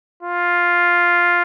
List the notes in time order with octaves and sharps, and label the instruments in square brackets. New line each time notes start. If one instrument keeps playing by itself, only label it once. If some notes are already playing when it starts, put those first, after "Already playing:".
[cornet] F4